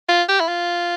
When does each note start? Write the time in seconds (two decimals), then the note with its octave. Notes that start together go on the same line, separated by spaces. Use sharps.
0.09 F4
0.29 G4
0.40 E4
0.48 F4